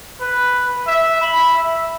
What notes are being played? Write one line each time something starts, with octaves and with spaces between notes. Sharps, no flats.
B4
E5
B5
E5